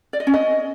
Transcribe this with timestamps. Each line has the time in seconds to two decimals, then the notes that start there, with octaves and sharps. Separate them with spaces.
0.13 D5
0.20 D#5
0.27 C#4
0.34 D#5